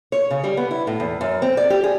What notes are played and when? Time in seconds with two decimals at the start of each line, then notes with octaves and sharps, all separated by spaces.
0.12 C#5
0.31 C#3
0.44 G3
0.57 B3
0.71 E4
0.87 A2
1.00 E2
1.21 F#2
1.42 C4
1.57 D5
1.70 G4
1.84 G#4